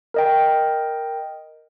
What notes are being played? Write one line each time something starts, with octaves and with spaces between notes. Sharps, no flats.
A#4 D#5 G5